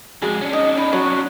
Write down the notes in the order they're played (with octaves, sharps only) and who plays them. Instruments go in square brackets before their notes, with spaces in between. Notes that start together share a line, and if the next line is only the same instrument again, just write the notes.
[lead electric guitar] F2 G#3 [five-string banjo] F#4 G#4
[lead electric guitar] C#4 D4
[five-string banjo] D#4 [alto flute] D#5
[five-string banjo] D#4 [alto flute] B5
[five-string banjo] F#3 [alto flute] F#4